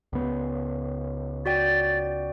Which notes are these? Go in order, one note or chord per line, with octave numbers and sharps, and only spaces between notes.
C#2 B3
F#4 D5 G5 A6